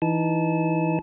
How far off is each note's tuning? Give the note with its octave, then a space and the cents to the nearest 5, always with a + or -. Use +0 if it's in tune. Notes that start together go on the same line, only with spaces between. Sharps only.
E3 -5 D#4 +0 A5 -25